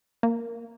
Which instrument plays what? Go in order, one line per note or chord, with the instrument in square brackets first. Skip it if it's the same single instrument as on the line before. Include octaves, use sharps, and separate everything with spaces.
[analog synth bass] A#3